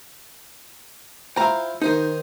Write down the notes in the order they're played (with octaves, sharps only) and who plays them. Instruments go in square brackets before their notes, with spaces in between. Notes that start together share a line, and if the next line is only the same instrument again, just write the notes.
[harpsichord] E4 F4 C5 [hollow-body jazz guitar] G5 A#5
[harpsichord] D#3 C5 D#6 [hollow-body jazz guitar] D#4